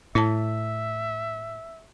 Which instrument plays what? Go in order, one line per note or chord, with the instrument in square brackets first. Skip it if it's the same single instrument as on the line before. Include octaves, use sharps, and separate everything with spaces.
[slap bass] A2 [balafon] E4 A5 [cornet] E5